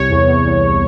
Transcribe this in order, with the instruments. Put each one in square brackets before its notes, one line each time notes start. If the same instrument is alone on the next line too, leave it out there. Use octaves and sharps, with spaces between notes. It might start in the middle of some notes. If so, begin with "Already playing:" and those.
Already playing: [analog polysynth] C2 C#5
E2
E2
E2